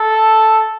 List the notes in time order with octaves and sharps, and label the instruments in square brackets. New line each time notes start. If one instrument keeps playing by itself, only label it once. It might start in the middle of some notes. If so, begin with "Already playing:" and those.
Already playing: [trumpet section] A4